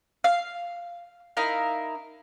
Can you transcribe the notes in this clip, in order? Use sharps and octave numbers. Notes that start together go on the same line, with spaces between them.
F5
D#4 E4 A#4 F5